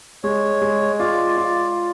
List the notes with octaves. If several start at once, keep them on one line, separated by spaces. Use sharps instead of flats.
G#3 C#5
G#3
F4 D5
F4